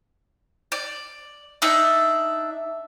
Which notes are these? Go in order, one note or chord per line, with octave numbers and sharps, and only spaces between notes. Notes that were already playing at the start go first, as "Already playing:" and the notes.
D5
D4 D#4 E5